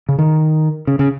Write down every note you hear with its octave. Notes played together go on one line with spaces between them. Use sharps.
C#3
D#3
C#3
C#3